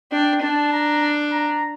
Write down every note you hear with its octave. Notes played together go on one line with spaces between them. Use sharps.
D4 G5
D4 A5
A#5
A#5